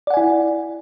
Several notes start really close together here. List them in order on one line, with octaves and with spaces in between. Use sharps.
D5 F#5 G#5 E4